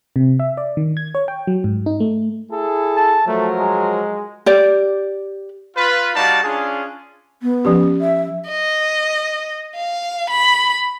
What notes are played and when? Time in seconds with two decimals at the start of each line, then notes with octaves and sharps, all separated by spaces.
0.16 C3
0.39 E5
0.57 D5
0.77 D#3
0.97 G#6
1.15 C#5
1.28 G5
1.47 F#3
1.64 G#2
1.86 D#4
2.00 A3
2.52 E4 G#4 A4
2.97 A5
3.28 F3 F#3 A3 A#4
3.59 G#3
4.46 G4 D5
5.77 F4 B4
6.15 G3 D#4 F#4 D5 F5 A5
6.44 C#4 D4 F4 G#4
7.43 B3
7.65 F3 C#4 G4
8.01 E5
8.48 D#5
9.76 F5
10.30 B5